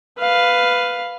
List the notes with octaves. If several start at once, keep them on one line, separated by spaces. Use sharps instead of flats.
B4 F5